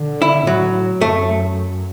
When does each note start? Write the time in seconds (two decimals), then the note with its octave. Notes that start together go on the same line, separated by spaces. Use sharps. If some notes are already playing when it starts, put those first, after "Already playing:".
Already playing: D3
0.22 E4
0.47 A2 F#3
1.01 F#2 A3